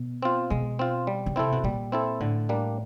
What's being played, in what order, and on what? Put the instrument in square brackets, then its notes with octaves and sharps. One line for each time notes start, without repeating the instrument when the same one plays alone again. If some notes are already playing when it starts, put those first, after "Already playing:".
Already playing: [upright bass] B2
[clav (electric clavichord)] C4 F4
[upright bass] B2 [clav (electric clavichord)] G#3
[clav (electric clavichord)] C4 F4
G3
[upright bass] C#3
[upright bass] C3 [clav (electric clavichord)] C4 E4 A4
[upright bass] B2
[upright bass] A#2 [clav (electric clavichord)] G3
[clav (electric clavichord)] C4 E4 A4
[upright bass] A2 [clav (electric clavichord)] D3
[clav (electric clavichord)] G3 A#3 D4